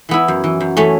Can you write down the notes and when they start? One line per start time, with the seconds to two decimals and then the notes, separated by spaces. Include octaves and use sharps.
0.09 E3 B3 E4
0.28 F#2
0.44 E3
0.60 F#2
0.77 E3 A3 C#4